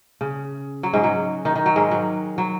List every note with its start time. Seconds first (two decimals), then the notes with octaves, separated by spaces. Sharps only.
0.21 C#3
0.83 F#3
0.93 G#2 G#3
1.04 F#3
1.45 D#3
1.55 D#3
1.66 F#3
1.76 G#2 G#3
1.91 F#3
2.38 F#3